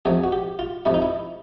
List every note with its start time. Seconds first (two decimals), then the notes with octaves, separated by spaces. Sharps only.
0.05 F2 C3 F3 G#4
0.24 F#4
0.32 G4
0.59 F4
0.85 F2 C3 F3 E4
0.94 D#4
1.02 E4